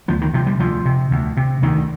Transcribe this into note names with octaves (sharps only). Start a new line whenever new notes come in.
D2 F3
D#3
C3 F3
G3
D2 F3
C3
D2
C3
D2 D#3